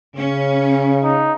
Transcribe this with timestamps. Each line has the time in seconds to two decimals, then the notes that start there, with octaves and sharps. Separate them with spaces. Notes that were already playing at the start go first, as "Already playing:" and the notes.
0.16 C#3 C#4
1.03 D#4